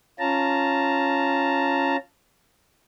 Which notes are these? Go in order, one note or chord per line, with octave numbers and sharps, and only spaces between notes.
C#4 F4 A5 A#5